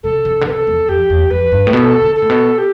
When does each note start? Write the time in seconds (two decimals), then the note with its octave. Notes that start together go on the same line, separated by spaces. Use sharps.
0.03 C3 A4
0.25 C3
0.41 D3
0.46 C3 B4
0.51 A4
0.67 E2
0.88 F2 G4
1.10 E2
1.30 F2 B4
1.52 G2
1.67 A2
1.73 B2 A4
2.01 D3
2.15 A4
2.22 A2
2.30 B2
2.58 G4